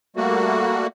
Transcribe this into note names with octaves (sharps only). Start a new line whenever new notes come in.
G3 A3 A#3 F#4